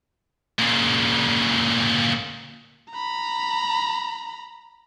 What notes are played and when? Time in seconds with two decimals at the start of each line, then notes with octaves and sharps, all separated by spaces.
0.59 A#2 C#3
2.92 A#5 B5